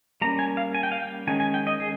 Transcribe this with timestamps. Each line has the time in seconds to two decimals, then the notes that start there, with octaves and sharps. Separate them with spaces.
0.22 G3 A#3 C#4 A#5
0.39 G#5
0.57 F5
0.74 G#5
0.83 G5
0.92 F5
1.00 G5
1.27 D#3 G#3 C#4 G#5
1.40 G#5
1.54 G5
1.67 D#5
1.80 G#4